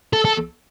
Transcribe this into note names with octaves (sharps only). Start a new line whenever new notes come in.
A4
A4